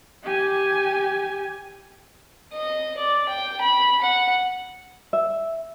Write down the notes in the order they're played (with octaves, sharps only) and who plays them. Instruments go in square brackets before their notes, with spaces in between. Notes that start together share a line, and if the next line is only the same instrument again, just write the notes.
[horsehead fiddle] G4 G#5
[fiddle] D#5
D5
G5
B5
F#5
[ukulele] E5